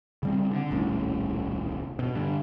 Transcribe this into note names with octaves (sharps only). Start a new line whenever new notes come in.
C#3 G3 C4
D3
D#1 C2 A2 C#4
B2
G2 D3